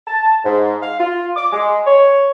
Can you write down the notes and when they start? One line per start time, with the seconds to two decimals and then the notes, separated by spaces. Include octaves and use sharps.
0.06 A5
0.45 G#2
0.81 F5
0.99 F4
1.36 D6
1.52 G#3
1.86 C#5